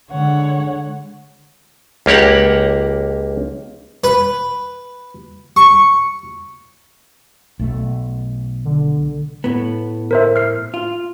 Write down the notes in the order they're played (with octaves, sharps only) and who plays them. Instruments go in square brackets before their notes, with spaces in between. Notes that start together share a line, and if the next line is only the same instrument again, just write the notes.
[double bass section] D3 G#3 [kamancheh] C#5 F#5
[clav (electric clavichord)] C#2 A#3 G4 C#5 F#5
[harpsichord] B4
C#6
[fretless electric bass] B1 A3
[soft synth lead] D3
[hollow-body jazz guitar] A2 B3
[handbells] A#4 C5 E5
F6 C7
[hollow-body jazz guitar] F4